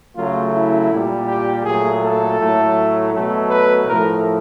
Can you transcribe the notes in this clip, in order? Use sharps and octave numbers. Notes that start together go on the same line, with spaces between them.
C#3 F#3 A3 F4
E4
A#2 G3
G4
A#2 F#3 A3 G#4
A4
A2 F#3 A3
B2 F#3 A3
B4
A2 F3 A3 A#4